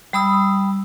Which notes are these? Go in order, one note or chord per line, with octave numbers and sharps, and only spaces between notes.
G3 B5 D#6 E6